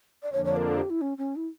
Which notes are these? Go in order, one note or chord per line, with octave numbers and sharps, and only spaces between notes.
D5
F2 D3 F3 A#3 D4 C#5
C#5
A#4
A4
G4
E4
C#4
C#4
E4